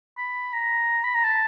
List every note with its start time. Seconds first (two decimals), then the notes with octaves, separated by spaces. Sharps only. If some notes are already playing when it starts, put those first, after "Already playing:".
0.18 B5
0.53 A#5
1.04 B5
1.15 A#5
1.24 A5